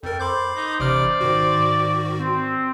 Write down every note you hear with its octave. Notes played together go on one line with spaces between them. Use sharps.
F2 A4 A#4 G5
C5 B5 D6 G6
D#4
A1 C3 D5 F6
G#2 D#3 F#4
C4